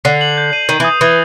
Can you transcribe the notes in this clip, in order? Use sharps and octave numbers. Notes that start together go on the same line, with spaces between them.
D3 C7
F#7
G6
D#7
D#3 G6
E3
D#6
E3 D#6